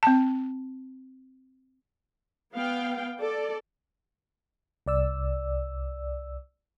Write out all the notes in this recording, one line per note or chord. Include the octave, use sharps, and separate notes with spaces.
C4 A5
B3 F5 G5
A4 D5
C2 D5 E6